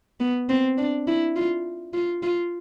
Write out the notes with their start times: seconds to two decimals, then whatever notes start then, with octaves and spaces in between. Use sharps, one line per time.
0.20 B3
0.49 C4
0.78 D4
1.07 E4
1.36 F4
1.93 F4
2.23 F4